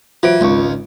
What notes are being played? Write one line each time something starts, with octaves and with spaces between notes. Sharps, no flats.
E3 F#3 F4 C5 D7
G#1 C#2 C#6